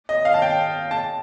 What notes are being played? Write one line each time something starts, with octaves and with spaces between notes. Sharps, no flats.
D#5
F5
A5
G5
A5